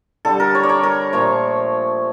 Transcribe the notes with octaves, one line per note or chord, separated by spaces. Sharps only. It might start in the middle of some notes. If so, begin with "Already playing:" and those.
D3 G3 A4
A#4
C#5
D5
C#5
A#4
A#2 F3 A3 C#5